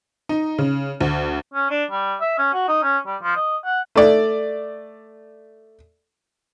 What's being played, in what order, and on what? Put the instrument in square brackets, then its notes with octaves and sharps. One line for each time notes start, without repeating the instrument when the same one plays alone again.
[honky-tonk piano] D#4
C#3
D2
[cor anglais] C#4
D4
G3
E5
C#4
F#4
D#4
C#4
G3
F3
D#5
F#5
[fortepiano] A3 D5